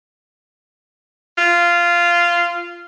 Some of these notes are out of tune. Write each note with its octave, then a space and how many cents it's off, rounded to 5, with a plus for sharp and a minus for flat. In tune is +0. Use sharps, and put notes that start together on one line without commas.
F4 -10